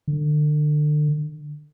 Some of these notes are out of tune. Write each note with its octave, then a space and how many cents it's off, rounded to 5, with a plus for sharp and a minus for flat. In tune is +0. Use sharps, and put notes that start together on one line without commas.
D3 +35